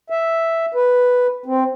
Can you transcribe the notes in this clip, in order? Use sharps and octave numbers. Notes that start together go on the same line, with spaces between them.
E5
B4
C4